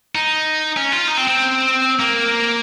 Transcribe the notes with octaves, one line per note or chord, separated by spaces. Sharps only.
D#4
C#4
F4
D#4
C4
C4
A#3